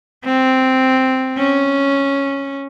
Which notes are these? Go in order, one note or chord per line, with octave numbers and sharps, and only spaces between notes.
C4
C#4